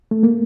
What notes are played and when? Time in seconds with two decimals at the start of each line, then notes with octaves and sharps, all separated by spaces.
0.11 A3
0.23 A#3